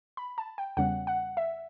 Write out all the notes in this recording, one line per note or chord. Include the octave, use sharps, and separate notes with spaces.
B5
A5
G5
E2 C#3 G3 C#4 F#5
F#5
E5